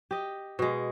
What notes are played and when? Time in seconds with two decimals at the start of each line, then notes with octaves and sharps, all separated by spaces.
0.11 G4 D#5
0.59 B2 G#3